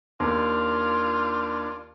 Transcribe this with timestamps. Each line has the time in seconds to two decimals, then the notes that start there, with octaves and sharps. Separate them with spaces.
0.20 D#2 D4 F4